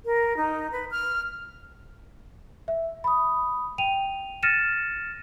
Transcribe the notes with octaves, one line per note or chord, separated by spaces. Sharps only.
A#4
D#4
B4
F6
E5
B5 D#6
G5 D#7 F7
F6 A6 A#6 C#7 D#7 E7